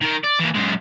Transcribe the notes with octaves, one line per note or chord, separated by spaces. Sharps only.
D#3 A#4
D5
E3 A#3
F#2 G#3